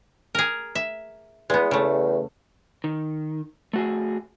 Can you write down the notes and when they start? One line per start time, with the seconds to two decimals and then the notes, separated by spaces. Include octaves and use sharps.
0.35 G#4 A#4
0.75 E5
1.50 E2 G#3 B3
1.71 C#3 A3
2.84 D#3
3.73 A3 F#4 G#4